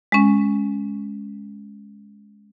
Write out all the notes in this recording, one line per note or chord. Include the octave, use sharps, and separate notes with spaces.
G#3 C#4